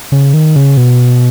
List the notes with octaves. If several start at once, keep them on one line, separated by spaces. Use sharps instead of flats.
C#3
D#3
C#3
B2